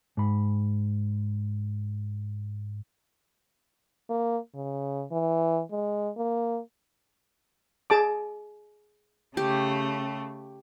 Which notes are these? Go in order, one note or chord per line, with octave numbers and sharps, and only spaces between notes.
G#2 B5
A#3
C#3
E3
G#3
A#3
G#4 A5 D6
C#3 A3 G4